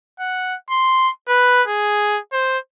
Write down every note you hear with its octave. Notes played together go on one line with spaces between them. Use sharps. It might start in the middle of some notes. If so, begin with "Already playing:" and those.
F#5
C6
B4
G#4
C5